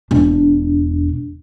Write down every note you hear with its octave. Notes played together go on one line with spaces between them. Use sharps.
E1 D4